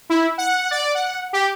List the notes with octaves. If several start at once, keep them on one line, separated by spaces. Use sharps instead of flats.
E4
F#5
D5
F#5
G4